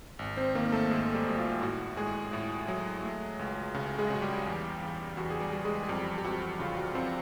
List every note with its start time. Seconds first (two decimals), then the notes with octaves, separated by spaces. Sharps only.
0.19 G#1
0.37 C4 C5
0.55 D#3 A#3 A#4
0.72 A3 A4
0.90 G#1 G#3 G#4
1.15 G3 G4
1.26 G#1 F#4
1.38 F4
1.61 A2 F#4
1.97 A2 G#3 G#4
2.33 A2
2.68 F#3
3.04 A3
3.39 C#2
3.74 C#3
3.98 G#3 G#4
4.10 C#3 F#4
4.22 G3 G4
4.46 E2
4.82 E2
5.17 E2 F#4
5.30 G#4
5.40 G3 G4
5.52 G3
5.65 G#3 G#4
5.83 G#4
5.88 F2 G3 G4
6.18 G4
6.24 F2 F#4
6.59 C#3 F4
6.77 F#4
6.94 F2 C4 C5